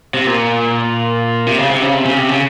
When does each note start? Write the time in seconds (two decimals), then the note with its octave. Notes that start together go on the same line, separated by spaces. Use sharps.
0.14 C3
0.27 A#2
1.47 C3
1.58 C#3
1.70 C3
1.82 C#3
1.94 C3
2.05 C#3
2.17 C3
2.29 C#3